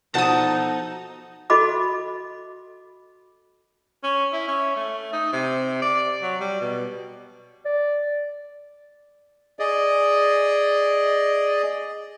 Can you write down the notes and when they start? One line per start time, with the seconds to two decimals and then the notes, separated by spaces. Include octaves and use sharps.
0.14 B2 F3 D#4 A4 F#5 A5 D#6
1.50 F#4 A4 D#5 B5 D6
4.03 C#4
4.33 E4
4.48 C#4
4.76 A3
5.13 D#4
5.33 C3
5.82 D5
6.22 F#3
6.40 G3
6.61 B2
7.65 D5
9.59 G#4 D5 D#5